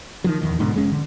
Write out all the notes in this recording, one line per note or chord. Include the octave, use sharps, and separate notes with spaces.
D#3 F3 F#3
D#1 A#1 E2 D#3
G#2 B2 D3
F1 G#3 C#4
D3